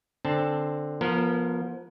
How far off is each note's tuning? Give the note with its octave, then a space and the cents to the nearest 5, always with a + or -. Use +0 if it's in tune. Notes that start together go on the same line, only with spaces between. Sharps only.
D3 +10 C4 +15 A5 +0
F3 +0 B3 -40 A#4 -20